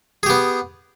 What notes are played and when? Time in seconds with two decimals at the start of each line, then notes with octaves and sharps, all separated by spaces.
0.23 G#4
0.26 G4
0.29 B3